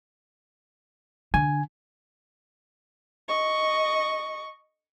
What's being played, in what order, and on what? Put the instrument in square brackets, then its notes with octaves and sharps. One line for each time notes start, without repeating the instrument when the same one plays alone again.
[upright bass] D3 [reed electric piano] G#5
[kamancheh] D#5 C#6